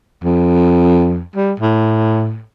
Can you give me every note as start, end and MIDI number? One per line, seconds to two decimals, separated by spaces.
0.24 1.23 41
1.36 1.53 55
1.60 2.40 45